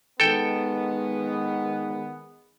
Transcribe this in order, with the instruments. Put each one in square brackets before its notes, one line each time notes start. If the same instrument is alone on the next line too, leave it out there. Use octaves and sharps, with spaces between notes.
[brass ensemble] D#3 G#3 B3 [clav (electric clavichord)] A4 G5